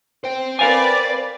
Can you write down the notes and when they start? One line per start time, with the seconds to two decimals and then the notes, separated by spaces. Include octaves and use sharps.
0.24 C5 G5
0.59 A#4 B4 D5 F5 G#5